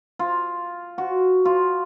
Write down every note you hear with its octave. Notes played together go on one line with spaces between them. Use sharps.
F4
F#4
F4